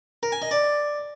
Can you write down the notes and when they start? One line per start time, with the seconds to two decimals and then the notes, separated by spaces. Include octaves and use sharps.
0.23 A#4
0.32 G#5
0.42 D#5
0.51 D5